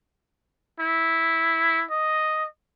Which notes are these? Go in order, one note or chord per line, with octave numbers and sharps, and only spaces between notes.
E4
D#5